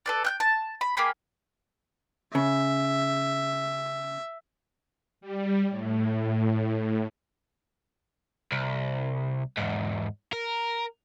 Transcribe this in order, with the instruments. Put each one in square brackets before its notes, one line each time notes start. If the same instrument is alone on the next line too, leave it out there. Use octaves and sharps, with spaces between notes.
[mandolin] A4 B4 D5
G5 F#6 G6
A5
B5
A#3 G4 G#4 B5
[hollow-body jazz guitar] C#3 [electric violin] E5
[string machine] G3
A2
[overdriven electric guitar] C2
E2 G#2
A#4